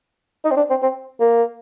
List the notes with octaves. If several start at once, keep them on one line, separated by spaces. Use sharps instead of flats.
D#4
C4
D4
C4
C4
A#3